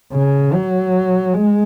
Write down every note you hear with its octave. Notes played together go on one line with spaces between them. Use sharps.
C#3
F#3
G#3